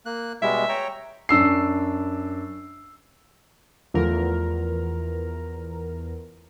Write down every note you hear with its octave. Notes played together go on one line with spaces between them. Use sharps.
A#3 F#6
B2 G3 G#3 E5
C#5 G5 A#5
F#2 D4 E6 C7
E2 F3 A3 A#4